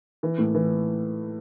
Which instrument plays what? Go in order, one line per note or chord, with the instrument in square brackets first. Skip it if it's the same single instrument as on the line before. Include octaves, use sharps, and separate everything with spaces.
[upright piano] E3
A2
E3